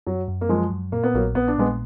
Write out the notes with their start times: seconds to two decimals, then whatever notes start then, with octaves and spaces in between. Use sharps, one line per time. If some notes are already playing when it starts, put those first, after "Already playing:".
0.07 F#2 F#3
0.28 F#2
0.41 A#3
0.49 F3 F#3 G#3
0.71 F#2
0.92 A#2 A#3
1.03 B3
1.14 A#1 F#3 A#3
1.35 A#1 B3
1.48 D4
1.57 A#2 G#3 B3